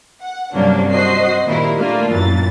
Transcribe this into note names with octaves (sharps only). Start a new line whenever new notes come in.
F#5
G2 C3 F#3 A#3 C#4 D4
F#4 C5 D#5 C7
A#2 D#3 G3 E4 A#4
A3 A#3 D4 F4
F#2 A#2 E3 A6